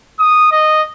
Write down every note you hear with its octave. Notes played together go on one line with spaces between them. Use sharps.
D#6
D#5